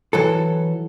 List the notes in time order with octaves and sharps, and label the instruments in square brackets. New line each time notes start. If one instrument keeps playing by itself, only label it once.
[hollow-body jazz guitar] E3 F#3 A4